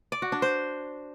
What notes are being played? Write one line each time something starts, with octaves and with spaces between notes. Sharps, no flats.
D5
F#4
D4
C5